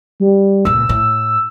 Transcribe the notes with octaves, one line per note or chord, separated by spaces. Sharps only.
G3
C#2 A#2 E6
A2